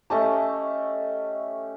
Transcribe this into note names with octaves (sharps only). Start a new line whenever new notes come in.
A3 C#4 G4 D#5 A5